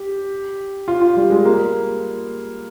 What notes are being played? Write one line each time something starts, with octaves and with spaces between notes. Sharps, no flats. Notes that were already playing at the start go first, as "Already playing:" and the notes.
Already playing: G4
F4
F4
G3
G#3
A#3